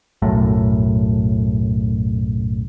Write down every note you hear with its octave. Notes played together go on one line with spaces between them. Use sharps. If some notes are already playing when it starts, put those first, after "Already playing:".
B1 F#2 A2